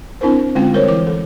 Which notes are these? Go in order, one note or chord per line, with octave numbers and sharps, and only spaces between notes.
C4 D4 E4 A#4 C5
D3 G#3 C4 C#4 F4 G5
G3 A#4 C5 C#5
E3 E4 D6
A4